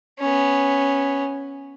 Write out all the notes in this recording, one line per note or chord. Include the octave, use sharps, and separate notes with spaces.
B3 C#4